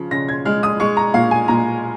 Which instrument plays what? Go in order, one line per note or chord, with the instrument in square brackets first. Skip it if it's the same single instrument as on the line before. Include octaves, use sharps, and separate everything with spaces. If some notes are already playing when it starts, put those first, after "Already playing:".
Already playing: [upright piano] C#3 F3
C#3 A#6
G#6
G#3 F6
D#6
G#3 C#6
A#5
A#2 F5
G#5
A#2 A#5